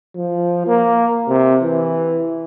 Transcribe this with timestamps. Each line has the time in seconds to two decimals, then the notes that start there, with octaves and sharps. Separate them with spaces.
0.16 F3
0.67 A#3
1.28 C3
1.62 E3